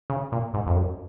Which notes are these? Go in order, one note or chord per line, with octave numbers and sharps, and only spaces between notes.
C#3
A#2
G#2
F2
F#2